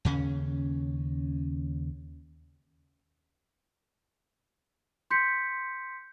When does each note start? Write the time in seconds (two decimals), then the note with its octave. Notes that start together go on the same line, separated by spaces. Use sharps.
0.05 D#2 C#3 C#4
5.11 C6 G6 B6 C#7